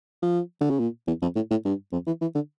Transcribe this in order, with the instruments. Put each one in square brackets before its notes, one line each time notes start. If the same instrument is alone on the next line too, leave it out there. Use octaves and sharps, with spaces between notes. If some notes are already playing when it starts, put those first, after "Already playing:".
[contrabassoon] F3
D3
C#3
A#2
E2
F2
A2
A2
G2
F2
E3
E3
D3